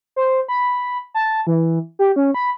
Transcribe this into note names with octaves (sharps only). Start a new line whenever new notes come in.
C5
B5
A5
E3
G4
C#4
B5